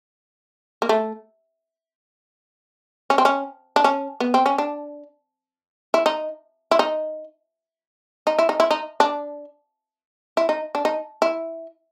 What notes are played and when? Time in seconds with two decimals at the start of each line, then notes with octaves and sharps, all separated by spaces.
0.82 A#3
0.89 A3
3.10 C#4
3.18 C4
3.25 C#4
3.76 D4
3.84 C#4
4.20 B3
4.34 C4
4.46 C#4
4.58 D4
5.94 E4
6.06 D#4
6.71 E4
6.79 D#4
8.27 D#4
8.39 E4
8.49 D#4
8.60 E4
8.71 D#4
9.00 D4
10.37 E4
10.49 D#4
10.75 D4
10.85 D#4
11.22 E4